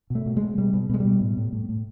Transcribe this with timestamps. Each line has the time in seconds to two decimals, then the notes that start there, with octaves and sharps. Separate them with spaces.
0.10 B2 A3
0.26 B2
0.37 B2 G#3
0.58 B2 G3
0.73 B2
0.89 B2 G#3
1.00 G3
1.05 B2
1.21 A2
1.37 A2
1.53 A2
1.69 A2